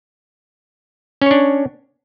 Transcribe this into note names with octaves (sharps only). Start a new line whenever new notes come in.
C#4 D4 C#5